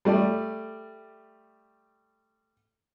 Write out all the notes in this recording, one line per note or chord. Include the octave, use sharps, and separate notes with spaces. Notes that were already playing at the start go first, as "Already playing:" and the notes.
G3 A3 D5